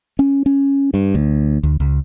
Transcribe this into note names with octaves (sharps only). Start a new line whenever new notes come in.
C#4
C#4
G2
D2
D2
C#2